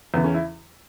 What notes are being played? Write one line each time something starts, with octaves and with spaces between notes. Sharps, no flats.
E2 C#3 E3 B3
C#4
E4